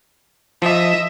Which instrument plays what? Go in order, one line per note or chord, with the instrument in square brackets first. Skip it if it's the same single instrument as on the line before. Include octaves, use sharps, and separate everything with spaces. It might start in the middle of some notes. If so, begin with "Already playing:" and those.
[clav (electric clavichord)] F3 [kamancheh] D#5 E5